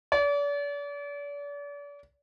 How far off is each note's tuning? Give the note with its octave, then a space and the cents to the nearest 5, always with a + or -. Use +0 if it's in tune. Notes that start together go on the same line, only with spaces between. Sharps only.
D5 -40